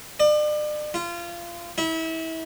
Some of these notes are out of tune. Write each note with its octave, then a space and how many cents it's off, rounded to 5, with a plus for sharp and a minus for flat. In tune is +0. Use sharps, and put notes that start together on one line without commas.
D5 +40
F4 -25
E4 -30